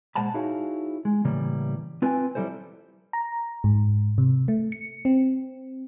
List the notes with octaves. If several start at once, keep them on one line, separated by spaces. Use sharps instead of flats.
A#2 G#3 C5 F#5 A5 B5
D#4 E4 F#4 G#4 C#5 F5
G#3
A2 C#3 E3 G3 A#3
C4 F4 B4 G5 G#5
F#3 G3 E4 A4 C5
A#5
G#2
C3
A3
C#7
C4